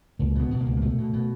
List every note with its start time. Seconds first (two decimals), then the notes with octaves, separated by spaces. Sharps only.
0.19 C#2 A#3
0.35 B2 B3
0.51 B2
0.61 A#3
0.66 C#2
0.77 A#3
0.82 B2 A3
0.98 B2
1.13 B2